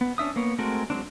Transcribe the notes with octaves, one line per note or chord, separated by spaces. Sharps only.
B3
C#4 D4 E5 D#6
A#3 B3 C#5
G#3 A3 C4 F#4 A#4
F#3 G#3 C4 D4